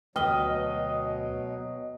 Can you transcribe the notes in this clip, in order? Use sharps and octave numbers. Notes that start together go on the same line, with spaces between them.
D2 B2 F#3 B4 D#5 G5 F6 G7